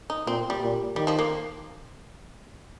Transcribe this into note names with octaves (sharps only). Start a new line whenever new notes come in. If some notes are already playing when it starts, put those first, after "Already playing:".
D#4
A#2 C4
G3
A#2
D#3 G3
F3
A#3